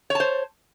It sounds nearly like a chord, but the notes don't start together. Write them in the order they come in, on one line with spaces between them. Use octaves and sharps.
C#5 A5 C5